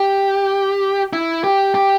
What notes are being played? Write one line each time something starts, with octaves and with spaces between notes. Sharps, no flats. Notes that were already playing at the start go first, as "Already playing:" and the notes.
Already playing: G4
E4
G4
G4